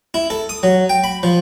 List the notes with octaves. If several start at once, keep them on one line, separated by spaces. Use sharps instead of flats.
E4
A4
D#6
F#3
G5
B5
F3